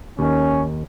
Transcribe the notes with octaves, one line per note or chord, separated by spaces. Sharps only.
D#2 D#3 C#4